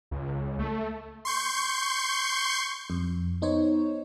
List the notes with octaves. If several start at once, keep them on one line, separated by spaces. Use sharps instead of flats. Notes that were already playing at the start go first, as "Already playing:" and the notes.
C#2
A3
C6 C#6 G6
F2
B3 D#4 C5 C#5